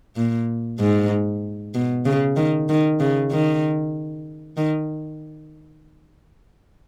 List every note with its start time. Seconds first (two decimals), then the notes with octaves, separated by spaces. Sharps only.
0.16 A#2
0.80 G#2
1.75 B2
2.06 C#3
2.36 D#3
2.69 D#3
3.00 C#3
3.32 D#3
4.57 D#3